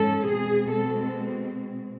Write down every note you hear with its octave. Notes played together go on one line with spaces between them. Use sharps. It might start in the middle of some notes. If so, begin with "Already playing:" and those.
Already playing: G#2 E3 G#3 C#4 A4
B2 G#3 C4 G#4
A4